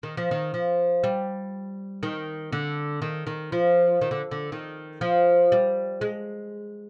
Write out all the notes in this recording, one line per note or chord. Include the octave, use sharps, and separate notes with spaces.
D#3
F3
D#3
F3
G3
D#3
D3
D#3
D#3
F3
D#3
D3
D3
D#3
F3
G3
G#3